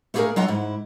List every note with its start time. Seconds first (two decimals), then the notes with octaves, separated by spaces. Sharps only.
0.14 A3 A#3 F4 G4 G#4 A#4
0.36 F#3 C#4 F4 D#5 F#5 A#5
0.48 G#2 E4